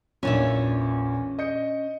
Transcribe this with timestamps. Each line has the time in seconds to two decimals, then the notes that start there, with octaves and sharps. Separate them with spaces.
0.23 A#1 E2 A#2 C#4 D4 E5
1.39 D#5 G6 C#7